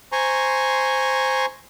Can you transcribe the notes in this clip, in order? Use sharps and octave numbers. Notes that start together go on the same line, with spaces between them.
C5 G#5 A#5 C6 C#6